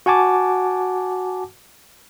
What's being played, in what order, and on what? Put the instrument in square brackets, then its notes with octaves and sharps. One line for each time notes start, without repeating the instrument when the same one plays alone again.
[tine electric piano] F#4 F#5 G#5 A5 D6